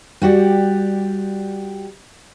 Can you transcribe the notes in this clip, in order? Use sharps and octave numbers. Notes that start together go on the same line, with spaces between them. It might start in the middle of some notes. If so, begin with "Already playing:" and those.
G3 F#4 G4 D5